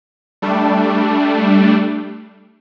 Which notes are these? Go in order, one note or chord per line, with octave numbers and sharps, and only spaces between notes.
G3 A3 D4